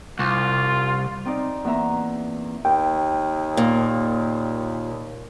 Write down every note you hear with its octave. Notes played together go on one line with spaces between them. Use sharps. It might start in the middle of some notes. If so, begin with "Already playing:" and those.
C2 F4
C4 D#4 D5
E2 A#3 E5 A#5
D#2 G5
A#2